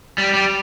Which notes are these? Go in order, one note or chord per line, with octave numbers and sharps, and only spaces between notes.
G3
G3